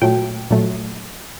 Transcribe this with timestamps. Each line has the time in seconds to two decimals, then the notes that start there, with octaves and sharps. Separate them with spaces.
0.02 A#2 F#3 A3 G5
0.51 A#2 F#3 A3